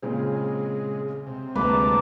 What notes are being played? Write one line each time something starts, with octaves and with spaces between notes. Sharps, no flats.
A#2 C#3 G#3 C4
C3
D2 G#3 A#3 B4 A5 A#5 D6